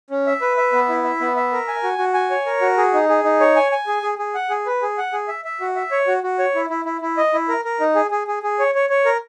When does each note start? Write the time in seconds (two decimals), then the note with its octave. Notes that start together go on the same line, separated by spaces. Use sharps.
0.10 C#4
0.27 E5
0.42 B4
0.57 E5
0.73 B3
0.89 E4
1.04 E5
1.21 B3
1.37 E5
1.52 A#4
1.68 G#5
1.83 F#4
1.98 F#4
2.14 G#5
2.30 C#5
2.46 A#4
2.61 F#4
2.77 G#4
2.94 D#4
3.09 G#4
3.24 D#4
3.40 C#5
3.56 G#5
3.72 G#5
3.87 G#4
4.02 G#4
4.18 G#4
4.35 F#5
4.50 G#4
4.66 B4
4.82 G#4
4.98 F#5
5.13 G#4
5.28 E5
5.45 E5
5.60 F#4
5.76 E5
5.91 C#5
6.07 F#4
6.23 F#4
6.39 C#5
6.55 E4
6.70 E4
6.85 E4
7.01 E4
7.17 D#5
7.34 E4
7.48 A#4
7.65 A#4
7.80 D#4
7.95 G#4
8.11 G#4
8.27 G#4
8.43 G#4
8.59 C#5
8.75 C#5
8.90 C#5
9.05 A#4